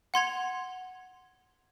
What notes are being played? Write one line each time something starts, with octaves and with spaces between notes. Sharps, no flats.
F#5 C6 G#6 F7